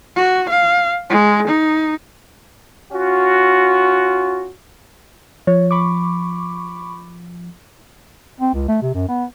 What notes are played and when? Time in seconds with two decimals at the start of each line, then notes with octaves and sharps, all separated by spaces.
0.16 F#4
0.49 F5
1.10 G#3
1.48 D#4
2.92 C#4 F4 F#4
5.47 F3 C#5
5.71 B5 C#6 D6
8.40 C4
8.54 C#2
8.68 A3
8.82 C3
8.94 F#2
9.09 B3